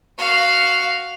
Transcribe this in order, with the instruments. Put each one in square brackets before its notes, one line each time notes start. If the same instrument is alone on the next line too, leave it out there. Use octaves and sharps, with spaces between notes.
[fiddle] F#4 F5